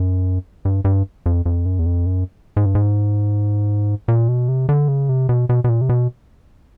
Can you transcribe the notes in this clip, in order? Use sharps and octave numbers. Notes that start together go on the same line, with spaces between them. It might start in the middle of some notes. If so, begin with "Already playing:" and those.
Already playing: F#2
G2
G2
F2
F2
F#2
E2
F2
F#2
G#2
G2
G#2
A#2
B2
C3
D3
C#3
C3
B2
B2
B2
A#2
C3
B2